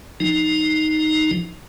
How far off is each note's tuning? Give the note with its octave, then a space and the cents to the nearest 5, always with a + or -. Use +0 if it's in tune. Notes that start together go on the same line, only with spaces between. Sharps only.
F3 +10 D#4 +0